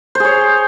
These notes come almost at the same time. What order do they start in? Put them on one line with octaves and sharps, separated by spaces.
C5 G#4 C#5